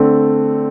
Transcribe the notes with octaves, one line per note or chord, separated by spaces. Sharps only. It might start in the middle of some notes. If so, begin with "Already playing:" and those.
Already playing: D3 A3 C4